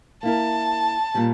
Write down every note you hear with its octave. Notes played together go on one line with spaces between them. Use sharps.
A#3 E4 A#4 A5
A#2 G3 C#4